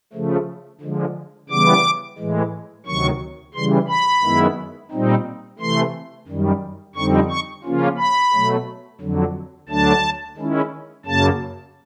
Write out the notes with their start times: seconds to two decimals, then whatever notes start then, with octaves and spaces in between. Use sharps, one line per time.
0.13 C#3 F3 A3
0.81 D3 F3 G#3
1.49 C#3 E3 G3 B3 D6
2.18 A2 E3 G#3
2.86 D2 C3 D#3 F#3 C#6
3.54 C#3 E3 G3 C6
3.88 B5
4.23 F#2 D#3 G#3 B3 E4
4.91 A#2 G3 C4 D#4
5.59 C3 E3 A3 C6
6.28 F#2 D#3 G3
6.95 F2 D3 G3 C4 D#4 C#6
7.30 C#6
7.64 C#3 F3 A#3 C#4 F4
7.98 B5
8.33 B2 F#3 A3
9.01 F2 D3 F#3
9.69 D2 D3 F#3 A3 D4 A5
10.37 D#3 G#3 C#4 E4
11.06 F#2 C#3 F#3 A#3 A5